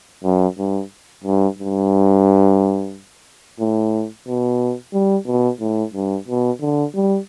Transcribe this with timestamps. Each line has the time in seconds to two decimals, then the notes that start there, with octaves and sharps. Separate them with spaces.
0.24 F#2
0.58 G2
1.24 G2
1.59 G2
3.60 A2
4.27 B2
4.93 G3
5.27 B2
5.60 A2
5.94 G2
6.28 B2
6.61 D3
6.95 G3